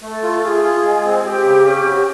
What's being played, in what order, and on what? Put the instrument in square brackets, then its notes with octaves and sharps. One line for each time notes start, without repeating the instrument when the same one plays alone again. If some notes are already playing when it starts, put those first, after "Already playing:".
[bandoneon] A3 [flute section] A4
[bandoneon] F4 [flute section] A4
[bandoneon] F4 [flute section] G#4
[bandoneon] F4
G#3
C4
[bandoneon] C4 [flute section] G4
[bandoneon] C#3
C#4
F#4